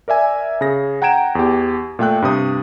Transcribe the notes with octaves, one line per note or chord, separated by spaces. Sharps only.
A#4 D5 E5 G#5
C#3 G#4 A#6
F#5 G5 A#5 G#6 D7 E7
E2 G4
A#2 A3 G5 F#6
G2 C3 D#6